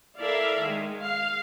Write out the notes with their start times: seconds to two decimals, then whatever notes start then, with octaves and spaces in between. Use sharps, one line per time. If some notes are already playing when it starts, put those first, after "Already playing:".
0.19 E4 A4 A#4 D5 E5 F5
0.62 D#3 G#3
1.02 F5